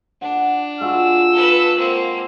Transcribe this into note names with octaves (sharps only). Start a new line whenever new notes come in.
D4 F#5 A5
G#3 F4 F#4 E6
A4 B4
A#3 C4